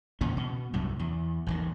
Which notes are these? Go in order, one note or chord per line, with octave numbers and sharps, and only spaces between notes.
E2 A#2 C#3 C#4
B2
C2 F#2 A2
E2
A1 E2 D#3